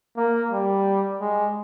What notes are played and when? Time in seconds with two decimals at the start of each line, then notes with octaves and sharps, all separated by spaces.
0.17 A#3
0.52 G3
1.21 G#3